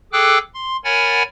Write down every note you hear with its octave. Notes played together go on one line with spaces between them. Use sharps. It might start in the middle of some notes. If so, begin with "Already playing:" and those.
G#4 A4 G5 D6 E6 F#6
C6
A#4 C#5 F#5 G#5 B5 A6